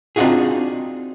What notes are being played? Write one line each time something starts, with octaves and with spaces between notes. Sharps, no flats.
C4 D4 D#4 F4 F#4 G#4